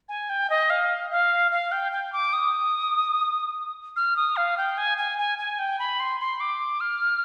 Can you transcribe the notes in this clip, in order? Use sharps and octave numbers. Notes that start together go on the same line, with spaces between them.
G#5
G5
D#5
F5
F5
F5
G5
G5
D6
D#6
F6
D#6
F5
G5
G#5
G#5
G#5
G#5
G5
B5
C6
C6
D6
F6